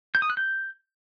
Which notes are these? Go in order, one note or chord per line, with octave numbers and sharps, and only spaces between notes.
G6
D#6
F#6
G6